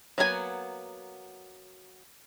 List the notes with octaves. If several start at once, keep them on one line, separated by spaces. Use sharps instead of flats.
F#3 A#3 B3 A4 G#5